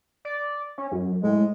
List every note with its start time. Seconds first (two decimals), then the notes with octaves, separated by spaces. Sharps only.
0.25 D5
0.78 C#4
0.92 F#2
1.23 A2 G#3